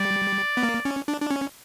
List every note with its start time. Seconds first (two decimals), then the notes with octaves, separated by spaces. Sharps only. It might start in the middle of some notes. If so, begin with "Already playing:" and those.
Already playing: G3 D5
0.57 B3
0.63 A#3
0.85 C#4
1.08 D4
1.21 D4
1.30 C#4